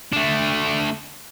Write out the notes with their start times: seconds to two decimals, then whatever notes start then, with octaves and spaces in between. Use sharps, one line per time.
0.13 A3 D4